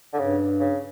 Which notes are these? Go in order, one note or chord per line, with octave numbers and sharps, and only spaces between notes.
D3
G2 C#3
C#3